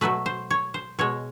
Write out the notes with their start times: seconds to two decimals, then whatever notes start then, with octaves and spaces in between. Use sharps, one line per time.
0.01 B2 F#3 A3 B4
0.26 C5
0.50 C#5
0.74 C5
0.99 B2 G#3 C#5